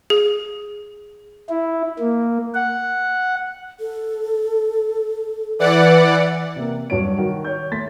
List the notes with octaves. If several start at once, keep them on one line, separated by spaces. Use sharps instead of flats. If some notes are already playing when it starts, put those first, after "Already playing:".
G#4
E4
A#3
F#5
A4
E3 B4 D5 F#5
C3 A#3
G2 F#3 C#5 D7
D#3 F#4
C#5 G6
A3 C6 A6 B6